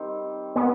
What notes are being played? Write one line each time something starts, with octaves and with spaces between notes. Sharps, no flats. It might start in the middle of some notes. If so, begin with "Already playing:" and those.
Already playing: D#3 G3 C4
B3